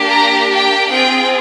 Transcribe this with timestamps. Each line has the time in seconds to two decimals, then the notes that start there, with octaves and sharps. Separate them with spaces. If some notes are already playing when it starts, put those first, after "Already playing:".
Already playing: A#3 D4 G4
0.09 A#5
0.50 G5
0.89 C4 F4 G#4 G5